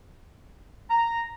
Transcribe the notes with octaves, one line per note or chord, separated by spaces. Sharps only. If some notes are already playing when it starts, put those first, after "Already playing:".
A#5